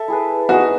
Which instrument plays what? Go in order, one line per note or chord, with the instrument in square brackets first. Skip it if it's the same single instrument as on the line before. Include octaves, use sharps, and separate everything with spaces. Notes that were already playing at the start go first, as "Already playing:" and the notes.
Already playing: [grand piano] A4 [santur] E5
[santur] E4 G#4 B4
[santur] D#4 G#4 D#5 [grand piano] F#4